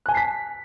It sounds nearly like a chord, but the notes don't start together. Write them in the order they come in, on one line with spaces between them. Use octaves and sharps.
F#6 G#5 A5 C7 B6